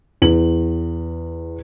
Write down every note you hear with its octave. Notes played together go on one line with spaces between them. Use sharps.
E2 F#7